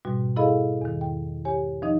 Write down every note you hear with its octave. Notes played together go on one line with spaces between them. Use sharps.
G#2 B2 G3 F#4
E4 G#4 A4 D#5 F5 B5
E2 D#3
G5
G4 C#5 G#5
F3 D#4 D#5